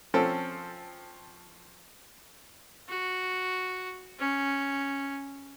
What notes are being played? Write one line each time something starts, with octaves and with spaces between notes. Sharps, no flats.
F3 C4 C#4 A4
F#4
C#4